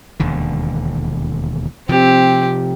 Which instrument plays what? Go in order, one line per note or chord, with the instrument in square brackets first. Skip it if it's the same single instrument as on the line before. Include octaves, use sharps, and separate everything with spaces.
[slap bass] E1 D#2 D3
[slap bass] C3 F3 [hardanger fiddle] C4 G4